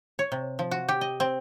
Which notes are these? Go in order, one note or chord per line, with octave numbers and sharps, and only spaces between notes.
C#5
C3
F3
F#4
G4
D#5
C4